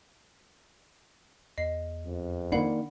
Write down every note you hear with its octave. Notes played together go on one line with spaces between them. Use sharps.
E2 D#5 C7
F2
D#3 A#3 D4 F#5 B5 C7